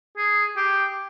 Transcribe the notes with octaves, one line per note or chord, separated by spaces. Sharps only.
G#4
G4